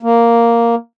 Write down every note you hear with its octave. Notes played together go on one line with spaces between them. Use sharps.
A#3